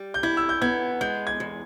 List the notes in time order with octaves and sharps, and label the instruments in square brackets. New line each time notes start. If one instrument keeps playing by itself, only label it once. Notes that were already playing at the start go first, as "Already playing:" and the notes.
Already playing: [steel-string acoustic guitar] G3
[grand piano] G6
[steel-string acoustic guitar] E4 [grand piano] G#6
[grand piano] E6
G6
[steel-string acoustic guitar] B3 [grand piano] G#6
[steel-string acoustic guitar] G#3 [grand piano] G6
[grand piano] G#6
[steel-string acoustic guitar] E2